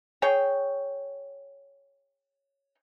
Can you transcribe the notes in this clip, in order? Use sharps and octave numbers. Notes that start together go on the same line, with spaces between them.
G#4 C#5 G5